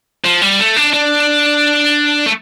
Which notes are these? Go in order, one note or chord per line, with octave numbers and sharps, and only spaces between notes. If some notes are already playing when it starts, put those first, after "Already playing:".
F3
G3
A3
D4
D4
A3